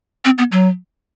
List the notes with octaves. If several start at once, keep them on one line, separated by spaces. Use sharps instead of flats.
C4
B3
F#3